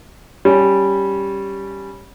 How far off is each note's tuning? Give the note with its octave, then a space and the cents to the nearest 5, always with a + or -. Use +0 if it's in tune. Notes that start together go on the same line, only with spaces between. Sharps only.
G3 +0 C#4 +10